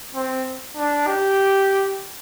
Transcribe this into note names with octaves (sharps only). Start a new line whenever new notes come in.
C4
D4
G4